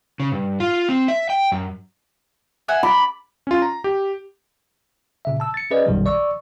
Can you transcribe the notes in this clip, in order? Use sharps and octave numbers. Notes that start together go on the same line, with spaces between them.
C#3
G2
F4
C4
E5
G5
F#2
E5 F#5 G#5
D5 B5
C#4 F4
A#5
G4
A#2 C#3 E5
A5 E6
A6 C#7
C#4 G#4 B4 D5 D#5
A#1 F#2 B2 D#3 F#3 G3
D5 C#6 E6